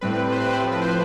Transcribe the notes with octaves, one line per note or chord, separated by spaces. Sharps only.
A2 G3 C4 B4
C5
B4
C5
A2 F3 C4
B4
C5